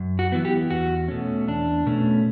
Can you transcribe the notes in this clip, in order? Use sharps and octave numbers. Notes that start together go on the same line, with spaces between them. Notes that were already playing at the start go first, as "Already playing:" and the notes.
Already playing: F#2
F#4
E3 B3
G4
E2 F#4
B2 A3 C#4
E2 D4
B2 A3 C#4